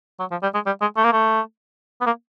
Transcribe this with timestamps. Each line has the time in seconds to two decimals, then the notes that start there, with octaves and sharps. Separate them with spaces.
0.19 F#3
0.31 F3
0.43 G3
0.54 G#3
0.66 G3
0.81 G#3
0.97 A3
1.04 A#3
1.13 A3
2.01 B3
2.06 A#3